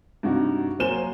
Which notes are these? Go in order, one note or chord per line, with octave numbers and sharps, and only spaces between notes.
G2 C3 D#4 F#4
F#3 A#3 C5 G#5 E7 G7